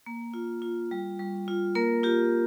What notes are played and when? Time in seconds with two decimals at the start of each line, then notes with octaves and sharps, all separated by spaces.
0.06 A#3
0.34 F4
0.62 F4
0.91 G3
1.19 G3
1.48 F4
1.75 A#3 A#4
2.03 F4 G4